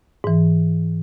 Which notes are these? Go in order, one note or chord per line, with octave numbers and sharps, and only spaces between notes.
G#2 E3